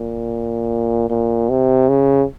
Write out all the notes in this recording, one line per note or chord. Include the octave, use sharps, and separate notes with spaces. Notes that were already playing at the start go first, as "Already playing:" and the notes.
Already playing: A#2
A#2
C3
C#3